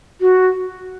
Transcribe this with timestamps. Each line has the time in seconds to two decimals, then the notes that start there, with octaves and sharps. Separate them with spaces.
0.21 F#4